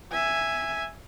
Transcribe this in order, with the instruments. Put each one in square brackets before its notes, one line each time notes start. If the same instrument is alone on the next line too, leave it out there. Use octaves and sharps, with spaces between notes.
[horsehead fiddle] E5 G#5